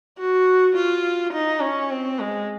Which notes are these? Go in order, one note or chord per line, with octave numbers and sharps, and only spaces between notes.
F#4
F4
D#4
C#4
C4
G#3